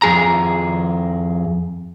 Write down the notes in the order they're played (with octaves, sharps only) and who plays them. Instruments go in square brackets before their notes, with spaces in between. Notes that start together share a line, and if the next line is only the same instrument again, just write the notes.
[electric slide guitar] F2 G#4 A#5